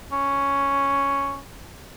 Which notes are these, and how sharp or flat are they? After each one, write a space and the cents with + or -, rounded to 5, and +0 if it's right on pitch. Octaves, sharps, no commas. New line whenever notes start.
C#4 +0